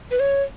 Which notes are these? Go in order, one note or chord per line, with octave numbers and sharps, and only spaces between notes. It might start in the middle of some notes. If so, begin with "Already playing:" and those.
B4
C#5